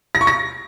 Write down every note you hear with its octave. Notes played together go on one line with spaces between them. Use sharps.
A#6
C#6
A#6